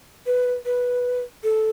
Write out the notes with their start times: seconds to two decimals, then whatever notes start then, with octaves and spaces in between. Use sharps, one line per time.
0.27 B4
0.66 B4
1.44 A4